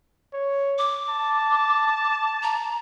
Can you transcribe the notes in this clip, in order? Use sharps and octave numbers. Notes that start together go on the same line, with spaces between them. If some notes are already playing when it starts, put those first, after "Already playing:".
C#5
D6
A5
A#5